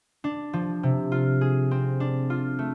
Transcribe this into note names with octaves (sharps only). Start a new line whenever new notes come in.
D4
F3
C3
F4
G#4
C4
D4
F4
A3